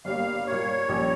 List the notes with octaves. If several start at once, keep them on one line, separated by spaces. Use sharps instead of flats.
G1 G2 G3 A#3 F5
A#2 G3 A#3 C#5
A#1 A#2 G3 C#4 G4